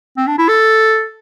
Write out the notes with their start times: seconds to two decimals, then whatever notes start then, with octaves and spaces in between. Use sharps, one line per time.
0.17 C4
0.27 D4
0.38 E4
0.49 A4